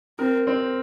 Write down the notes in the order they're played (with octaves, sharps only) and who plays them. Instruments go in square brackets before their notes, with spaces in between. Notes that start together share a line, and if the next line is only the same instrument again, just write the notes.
[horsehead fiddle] C4 [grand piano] A#4
[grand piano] C4